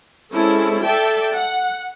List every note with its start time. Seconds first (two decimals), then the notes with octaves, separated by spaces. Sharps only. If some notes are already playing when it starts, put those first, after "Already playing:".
0.32 G#3 C4 C#4 E4 A4
0.83 A4 D5 E5 G5 A5
1.34 F#5